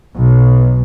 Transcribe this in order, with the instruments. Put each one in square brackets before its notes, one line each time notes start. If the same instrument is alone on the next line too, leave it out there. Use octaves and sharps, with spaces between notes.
[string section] B1